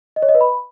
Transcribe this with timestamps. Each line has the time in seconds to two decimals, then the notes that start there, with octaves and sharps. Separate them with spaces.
0.16 D#5
0.22 C#5
0.28 D#5
0.35 B4
0.41 B5